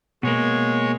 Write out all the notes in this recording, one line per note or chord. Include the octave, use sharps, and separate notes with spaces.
B2 G#3 A#3 C#5